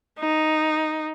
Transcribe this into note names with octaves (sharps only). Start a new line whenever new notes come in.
D#4